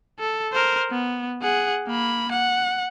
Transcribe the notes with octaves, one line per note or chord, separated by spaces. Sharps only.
A4
A#4 C5
B3
G#4 F#5
A#3 B5
F#5